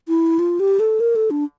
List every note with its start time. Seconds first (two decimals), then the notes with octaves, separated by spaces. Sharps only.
0.08 E4
0.39 F4
0.60 G4
0.80 A4
1.00 A#4
1.16 A4
1.31 D4